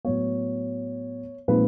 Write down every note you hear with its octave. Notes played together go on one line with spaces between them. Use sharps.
A2 F#3 B3 C#5
A#2 F3 G#3 C4 D#4 B4